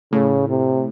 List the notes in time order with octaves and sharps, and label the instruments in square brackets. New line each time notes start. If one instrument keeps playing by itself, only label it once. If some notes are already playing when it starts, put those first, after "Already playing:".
[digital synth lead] A2 [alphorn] C#3
[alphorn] C3